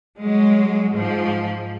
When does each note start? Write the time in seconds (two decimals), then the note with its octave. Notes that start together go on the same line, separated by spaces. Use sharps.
0.19 F#3 G#3
0.94 G#2 F3